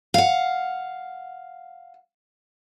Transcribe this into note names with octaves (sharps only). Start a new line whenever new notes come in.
F5 F#5